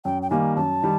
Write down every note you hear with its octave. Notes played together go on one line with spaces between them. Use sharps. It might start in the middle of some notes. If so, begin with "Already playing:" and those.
F#2 G5
G5
D#3 G3 A#3 G#5
F#2 A5
D#3 G3